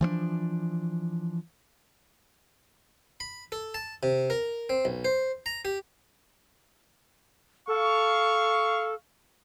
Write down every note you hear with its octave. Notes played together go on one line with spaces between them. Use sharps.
E3 F3 A3 D4
B5
A4
A5
C3
A#4
C4
B1
C5
A#5
G4
A4 F5 C#6